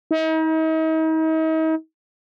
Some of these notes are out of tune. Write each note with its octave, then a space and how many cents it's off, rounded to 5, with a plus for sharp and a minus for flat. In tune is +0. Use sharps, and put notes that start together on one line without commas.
D#4 +40